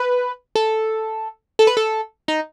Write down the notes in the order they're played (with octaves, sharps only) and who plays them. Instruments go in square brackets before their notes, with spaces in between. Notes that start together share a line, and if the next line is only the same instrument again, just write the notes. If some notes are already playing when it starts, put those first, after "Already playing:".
Already playing: [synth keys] B4
A4
A4
B4
A4
D#4